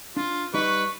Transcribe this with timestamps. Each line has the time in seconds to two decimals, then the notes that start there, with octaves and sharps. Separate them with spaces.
0.17 D4 F4
0.54 G3 D#4 B4 D#5 C#6